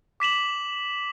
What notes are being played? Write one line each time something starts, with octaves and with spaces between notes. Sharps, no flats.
D6 B6 E7 F#7